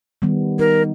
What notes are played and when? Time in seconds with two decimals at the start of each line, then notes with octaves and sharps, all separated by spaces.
0.22 D#3 G3 B3
0.59 D#4 A#4